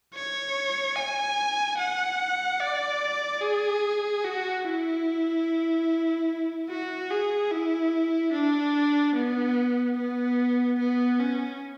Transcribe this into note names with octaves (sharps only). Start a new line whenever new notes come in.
C#5
G#5
F#5
D5
G#4
F#4
E4
F#4
G#4
E4
D4
B3
B3
B3
C#4